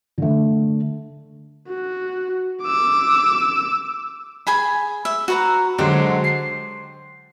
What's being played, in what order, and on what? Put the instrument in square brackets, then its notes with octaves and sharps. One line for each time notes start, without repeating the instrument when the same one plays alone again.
[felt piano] D3 A3
[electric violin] F#4
D6 E6
[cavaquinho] G#4 G#5 B5
E5
F#4 B4 A#5
[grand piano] D3 F#3 G#3 [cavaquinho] G4 C5
[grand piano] C7